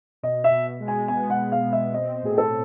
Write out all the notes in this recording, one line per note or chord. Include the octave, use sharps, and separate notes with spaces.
B2 D#5
E5
B2
G#3
G#5
B3 G#5
F#5
B2
F5
B2
E5
C4 D#5
A2 G#4
A4